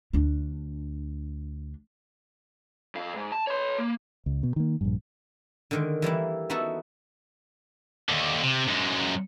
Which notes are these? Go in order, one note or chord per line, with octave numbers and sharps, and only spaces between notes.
D2 D4
F2 F5
G#2
A5
C#5 C6
A#3
C#2
B2
D#3 A#3
A#1 E2 G2
D3 D#3 G#3
E3 G3 A#3 E4
B3 D#4 E4 F#4 A4
D#2 D3
C3
F#2 G#3